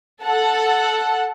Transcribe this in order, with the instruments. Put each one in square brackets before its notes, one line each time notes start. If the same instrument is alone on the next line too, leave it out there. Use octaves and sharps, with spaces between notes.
[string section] A4 F#5